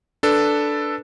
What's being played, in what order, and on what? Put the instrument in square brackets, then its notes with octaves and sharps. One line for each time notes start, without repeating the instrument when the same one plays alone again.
[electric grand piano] D4 A4 B4